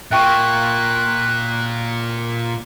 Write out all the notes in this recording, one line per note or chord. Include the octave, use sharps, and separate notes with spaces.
A#2 A#3 E5 G5 C#6 F#6